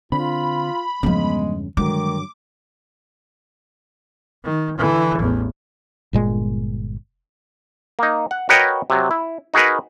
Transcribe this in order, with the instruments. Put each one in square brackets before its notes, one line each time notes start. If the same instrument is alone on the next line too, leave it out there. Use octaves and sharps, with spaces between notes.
[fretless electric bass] D3 C4 D4 [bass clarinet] F4 [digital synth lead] B5
[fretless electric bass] E2 G2 C#3 [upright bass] F3 B3 [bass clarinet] G#3
[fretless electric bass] G2 D3 F#3 [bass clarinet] D#3 [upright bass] G#3 [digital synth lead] D6
[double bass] D#3
D3 E3
A1 E2
[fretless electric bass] G1 A#2 G#3
[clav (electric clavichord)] A#3 D#4
F#5
F#4 A#4 B4 C#5 D#5 G5
C3 F#3
E4
D#4 F#4 G#4 A#4 B4